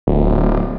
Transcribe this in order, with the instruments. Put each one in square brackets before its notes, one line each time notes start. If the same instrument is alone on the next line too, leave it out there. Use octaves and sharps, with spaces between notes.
[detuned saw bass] D1